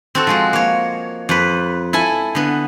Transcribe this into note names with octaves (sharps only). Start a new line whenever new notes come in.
C4 F#4 A4
F3 G#3 F#4
A#3 C#5
F2 B4
E4 A4 G#5
D3 B3